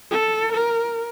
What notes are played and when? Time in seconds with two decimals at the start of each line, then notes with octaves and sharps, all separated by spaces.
0.11 A4
0.52 A#4